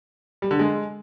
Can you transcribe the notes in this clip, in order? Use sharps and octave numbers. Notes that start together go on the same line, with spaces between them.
G3
D3
G#3